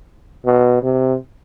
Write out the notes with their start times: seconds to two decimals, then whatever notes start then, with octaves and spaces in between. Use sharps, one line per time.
0.45 B2
0.82 C3